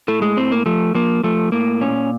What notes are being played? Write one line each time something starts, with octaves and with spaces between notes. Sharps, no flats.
A2 A3
G#3
A2 C4
A#3
F3 A3
F3 A#3
F3 A3
A2 A#3
A#2 C#4